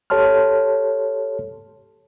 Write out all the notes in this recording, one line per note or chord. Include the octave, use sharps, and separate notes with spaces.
G4 A4 C#5 A5 C6 F6